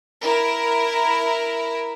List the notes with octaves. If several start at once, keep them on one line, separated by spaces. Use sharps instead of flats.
E4 A#4